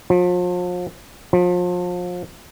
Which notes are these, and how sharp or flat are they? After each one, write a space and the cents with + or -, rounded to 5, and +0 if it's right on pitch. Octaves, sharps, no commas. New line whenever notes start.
F3 +40
F3 +35